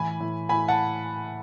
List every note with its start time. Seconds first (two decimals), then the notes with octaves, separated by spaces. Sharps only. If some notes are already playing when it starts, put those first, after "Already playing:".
Already playing: A2 E3 G#5 B5
0.20 A2
0.49 A2 G#5 B5
0.68 F#5 A5